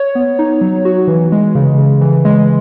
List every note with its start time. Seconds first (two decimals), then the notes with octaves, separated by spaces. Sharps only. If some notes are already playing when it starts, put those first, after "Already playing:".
Already playing: C#5
0.15 B3
0.39 D#4
0.61 F#3
0.85 F#4
1.07 E3
1.32 G#3
1.55 C#3
1.78 C#3
2.01 E3
2.25 G#3